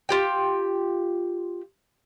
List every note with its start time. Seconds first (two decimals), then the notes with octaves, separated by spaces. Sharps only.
0.09 F4 G4 G5